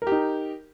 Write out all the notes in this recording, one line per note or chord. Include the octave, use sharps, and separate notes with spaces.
D#4 G4 A#4